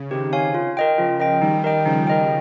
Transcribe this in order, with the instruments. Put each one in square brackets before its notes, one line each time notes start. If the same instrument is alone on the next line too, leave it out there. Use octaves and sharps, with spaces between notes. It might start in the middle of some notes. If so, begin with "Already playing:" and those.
Already playing: [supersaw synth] C#3
[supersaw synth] C3 D#3 [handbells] G4
[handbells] C#5 F5 G#5
F4
A#4 D#5 G5
[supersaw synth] C#3 F3 [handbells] F4
[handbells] A#4 D#5 G5
[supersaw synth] D#3 G3 [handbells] D#4
[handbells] A#4 D#5 G5
[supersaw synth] C#3 F3 [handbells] D#4
[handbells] A#4 D#5 G5